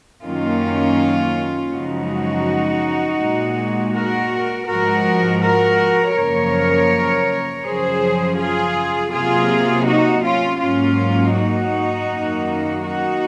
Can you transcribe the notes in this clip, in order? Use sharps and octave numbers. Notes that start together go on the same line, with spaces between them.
F#2 D#3 A#3 C#4 F4
F#2 C#3 F3 G#3 D#4 F#4
A#2 G#3
F#4 A#4
G#2 F3 G#3 F#4 A#4
F#4 A#4
F#2 C#3 F3 A#3 A#4 C#5
F#2 C#3 F3 G#4 C5
F4 G#4
C3 F#3 A#3 F4 G#4
D#4 F#4
C#4 F4
G#2 F#3 A#3 C#4 F4
D#4 F#4
F#2 D#3 A#3
D#4 F#4